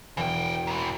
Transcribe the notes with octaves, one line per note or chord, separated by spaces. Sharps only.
E1 E3 G5
G#2 E3